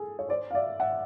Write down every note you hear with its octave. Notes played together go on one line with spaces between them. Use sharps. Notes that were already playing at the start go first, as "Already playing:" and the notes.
Already playing: G#4 A4
C#5
C5 D5
F5
D5 E5
E5 F#5